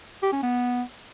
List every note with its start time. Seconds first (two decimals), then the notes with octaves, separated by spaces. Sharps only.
0.23 G4
0.33 C#4
0.43 B3